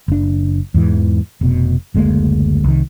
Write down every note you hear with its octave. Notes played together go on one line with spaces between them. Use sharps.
F#1 D4
E2 G#2 E3
F1 B2
F#1 D2 G#3 A#3
C2 D#3